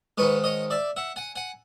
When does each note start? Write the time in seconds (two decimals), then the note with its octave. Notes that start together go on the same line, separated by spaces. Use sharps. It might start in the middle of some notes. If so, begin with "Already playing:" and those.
0.18 G#2 D#3 G#3 B4 C#5
0.44 C#5 D#5
0.70 D5 E5
0.96 E5 F#5
1.16 F#5 G#5
1.36 F#5 G#5